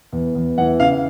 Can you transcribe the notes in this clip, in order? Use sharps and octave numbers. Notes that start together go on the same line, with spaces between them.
E2
E2
E3 F#5
C#3 F5